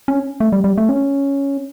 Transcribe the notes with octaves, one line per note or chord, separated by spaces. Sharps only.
C#4
A3
G3
G3
A3
C#4